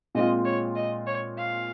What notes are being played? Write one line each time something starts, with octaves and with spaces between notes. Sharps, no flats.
A#2 G#3 C4 F4 D#5
C#5
D#5
C#5
F5